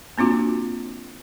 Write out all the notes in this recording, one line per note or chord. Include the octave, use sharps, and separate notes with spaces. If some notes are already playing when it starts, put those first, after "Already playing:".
A#3 C4 D4 F4 F#4